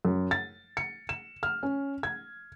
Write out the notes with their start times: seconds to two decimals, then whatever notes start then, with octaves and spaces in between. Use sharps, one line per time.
0.05 F#2
0.31 A6
0.77 C#7
1.09 E7
1.43 F6
1.63 C#4
2.03 G#6